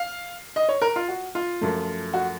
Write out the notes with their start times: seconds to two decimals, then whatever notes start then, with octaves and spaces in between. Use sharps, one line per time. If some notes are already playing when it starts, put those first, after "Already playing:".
Already playing: F5
0.56 D#5
0.69 C#5
0.82 A#4
0.96 F4
1.08 F#4
1.35 F4
1.61 F#2 F3 A3
2.14 F#4